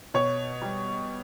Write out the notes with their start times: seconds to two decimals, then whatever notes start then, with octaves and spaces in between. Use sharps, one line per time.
0.14 B2 C#5
0.62 G3